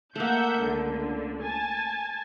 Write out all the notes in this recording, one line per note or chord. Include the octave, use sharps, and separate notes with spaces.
A3 A#3 E5 F#5 G6
C#2 D3
G#5 A5